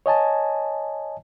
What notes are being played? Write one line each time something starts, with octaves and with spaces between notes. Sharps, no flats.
C#5 D#5 G#5 A5